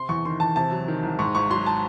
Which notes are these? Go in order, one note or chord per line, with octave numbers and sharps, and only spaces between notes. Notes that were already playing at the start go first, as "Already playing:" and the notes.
Already playing: C3 C6
E2 C#6
D#3 C6
E2 A5
C3 A5
F#3
D#3
C2
G#2 C#6
G#1 C#6
F#3 C6
A5